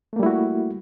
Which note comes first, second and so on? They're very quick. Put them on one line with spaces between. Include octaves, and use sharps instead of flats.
A3 A#3 G3 E4 F#4